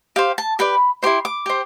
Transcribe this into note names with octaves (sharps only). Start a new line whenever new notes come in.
G4 C5 F5
A5
G4 B4 D5 B5
E4 G4 C5 C6
D6
G4 C5